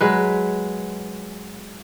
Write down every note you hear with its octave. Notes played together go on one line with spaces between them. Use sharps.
F#3 G#3 B4